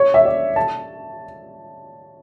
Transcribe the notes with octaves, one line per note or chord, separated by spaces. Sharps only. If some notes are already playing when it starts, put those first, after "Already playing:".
Already playing: C#5
E5
D5
A5